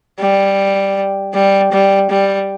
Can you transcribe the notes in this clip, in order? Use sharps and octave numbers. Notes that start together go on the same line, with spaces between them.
G3
G3
G3
G3